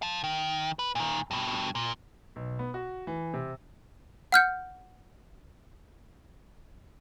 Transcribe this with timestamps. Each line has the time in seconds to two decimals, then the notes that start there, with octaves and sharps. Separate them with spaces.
0.02 F5 A5
0.24 D#3
0.79 B4
0.95 A#2 D#3
1.31 G2 B2
1.75 A#2
2.36 B1
2.59 B3
2.74 F#4
3.07 E3
3.34 C3
4.32 F#5 F6 G6 C#7